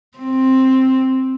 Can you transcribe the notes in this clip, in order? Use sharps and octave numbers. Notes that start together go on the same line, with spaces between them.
C4